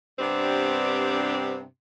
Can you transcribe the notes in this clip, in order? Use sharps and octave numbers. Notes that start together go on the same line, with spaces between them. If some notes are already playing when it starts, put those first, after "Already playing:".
G2 C3 B3 C4 D4 G4